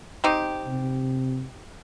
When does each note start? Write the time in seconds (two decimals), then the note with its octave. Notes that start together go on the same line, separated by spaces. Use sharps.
0.24 C4 D#4 G4
0.67 C3